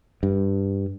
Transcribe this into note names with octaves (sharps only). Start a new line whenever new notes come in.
G2